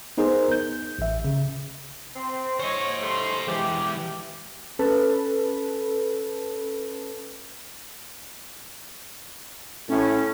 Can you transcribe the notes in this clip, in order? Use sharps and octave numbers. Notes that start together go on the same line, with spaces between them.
B3 D#4 G#4 A#4 C5
G6
A1 E5
C#3
C4
C5 C#5 D#5
G3 A3 C6
E3 G#3 G4
C#4 A4 B4
A2 C#4